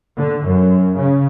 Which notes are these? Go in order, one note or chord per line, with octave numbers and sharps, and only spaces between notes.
D3
F#2
C#3